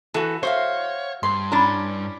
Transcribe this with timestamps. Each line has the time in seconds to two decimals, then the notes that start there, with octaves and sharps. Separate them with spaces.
0.14 E3 F#4 A4
0.43 F#4 C5 C#5 E5 F5
1.23 G2 C6
1.52 C#4 D4 E4 B5